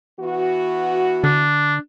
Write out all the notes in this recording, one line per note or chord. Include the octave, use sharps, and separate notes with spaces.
E3 B3 F#4
D3 D4